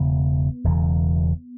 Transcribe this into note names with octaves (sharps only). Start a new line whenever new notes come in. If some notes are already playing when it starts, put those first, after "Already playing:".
Already playing: E1 E2 C#3 B3
E1 E2 C#3